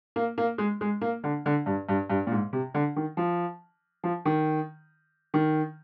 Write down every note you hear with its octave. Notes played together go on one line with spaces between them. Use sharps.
A#3
A#3
G#3
G#3
A#3
D3
D3
G2
G2
G2
A#2
G#2
C3
D3
D#3
F3
F3
D#3
D#3